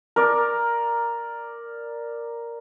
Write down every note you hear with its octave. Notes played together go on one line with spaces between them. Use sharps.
A#4 D5